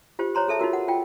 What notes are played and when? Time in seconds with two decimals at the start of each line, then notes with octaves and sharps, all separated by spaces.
0.19 F4 G4 C5
0.35 C5 C#5 A#5 C6
0.48 G#4 A4 E5 A5
0.59 D#4 F4 F#4 A#4
0.73 F#5
0.88 F4 G5